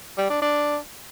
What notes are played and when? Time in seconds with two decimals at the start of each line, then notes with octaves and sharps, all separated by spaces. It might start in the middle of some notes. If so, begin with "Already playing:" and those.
0.18 G3
0.30 D4
0.42 D4